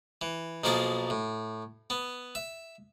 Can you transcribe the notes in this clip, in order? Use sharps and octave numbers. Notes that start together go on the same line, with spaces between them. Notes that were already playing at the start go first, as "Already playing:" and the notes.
E3
B1 F3 A#3 G#4 D5
A2
B3
E5